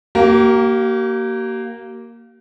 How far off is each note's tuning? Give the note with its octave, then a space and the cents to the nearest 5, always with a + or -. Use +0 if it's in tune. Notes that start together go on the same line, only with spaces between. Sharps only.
A#3 -5 G4 -45